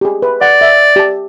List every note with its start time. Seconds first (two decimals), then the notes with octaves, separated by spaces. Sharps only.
0.01 G4 G#4
0.22 B4
0.41 D5 F#5
0.61 E5
0.96 G4 A5